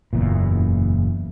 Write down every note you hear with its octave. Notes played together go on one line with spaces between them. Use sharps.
F#1 E2 A#2